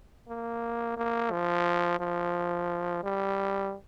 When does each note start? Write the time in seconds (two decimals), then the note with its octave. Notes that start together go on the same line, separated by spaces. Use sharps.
0.29 A#3
0.97 A#3
1.31 F3
2.00 F3
3.03 G3